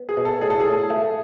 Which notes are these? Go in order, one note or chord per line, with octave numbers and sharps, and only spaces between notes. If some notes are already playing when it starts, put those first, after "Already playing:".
Already playing: B3
G#4
B2
A4
A2 G#4
A4
G#4
A2
A3